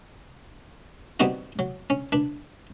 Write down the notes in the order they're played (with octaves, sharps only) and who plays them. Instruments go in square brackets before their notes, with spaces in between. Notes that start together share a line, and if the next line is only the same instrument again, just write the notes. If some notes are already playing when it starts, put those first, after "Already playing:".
[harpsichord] B2 G3 B3 C4 D#4 F#4
F#3
C#4
D4 B4